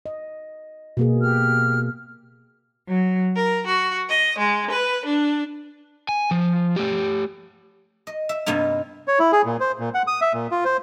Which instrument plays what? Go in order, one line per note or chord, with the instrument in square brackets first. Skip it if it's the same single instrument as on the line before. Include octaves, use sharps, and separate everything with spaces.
[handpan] D#5
B2 A#3 G#4
[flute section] G4 F6
[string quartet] F#3
A#4
F#4
D#5
G#3
B4
D4
[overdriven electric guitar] G#5
F3
A3 G4
[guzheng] D#5
E5
G2 C3 A#3 B3 D#4
[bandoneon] C#5
E4
G#4
A#2
C5
A#2
F#5
D#6
E5
A#2
F4
C5